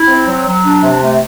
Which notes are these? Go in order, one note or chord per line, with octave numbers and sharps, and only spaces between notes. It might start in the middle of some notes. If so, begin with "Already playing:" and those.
Already playing: E4
C4
F#3
F#3
D4
C3
A3